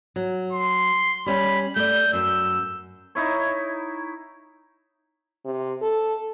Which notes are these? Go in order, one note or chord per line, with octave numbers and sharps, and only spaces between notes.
F#3
C6
G3 C#4 G5 B5
A3 D5 G6
F#2 E6
D#4 E4 C#5
C3
A4